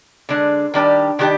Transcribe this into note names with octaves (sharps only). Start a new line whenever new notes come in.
D3 G#3 D4
D#3 G3 D4 G4
D#3 G3 D4 G4